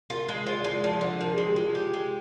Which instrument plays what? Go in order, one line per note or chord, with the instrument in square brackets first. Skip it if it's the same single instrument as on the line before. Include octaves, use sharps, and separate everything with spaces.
[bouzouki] F4 [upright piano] A#4
[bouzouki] G#3
[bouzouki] F4 [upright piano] C5
[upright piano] D5
[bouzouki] G#3
[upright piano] D5
[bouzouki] F3 [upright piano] D5
[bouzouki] D3 [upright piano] C5
[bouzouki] F3 [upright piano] A#4
[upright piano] G#4
[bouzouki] G#3
[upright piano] G4
[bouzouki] G#3 [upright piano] F4
[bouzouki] G4
G#3